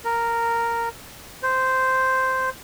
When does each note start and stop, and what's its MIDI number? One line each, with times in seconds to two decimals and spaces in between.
0.04 0.89 70
1.43 2.50 72